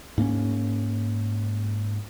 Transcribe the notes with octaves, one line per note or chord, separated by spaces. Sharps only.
G#2 A#3 C4 C#4